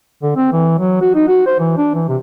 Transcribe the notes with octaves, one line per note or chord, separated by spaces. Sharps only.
D3
C4
E3
F#3
F#4
D#4
F#4
C5
E3
D4
E3
C3